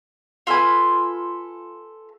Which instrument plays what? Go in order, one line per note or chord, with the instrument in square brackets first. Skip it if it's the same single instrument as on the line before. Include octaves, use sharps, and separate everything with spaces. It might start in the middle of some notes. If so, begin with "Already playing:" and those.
[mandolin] F4 A4 B4 G#5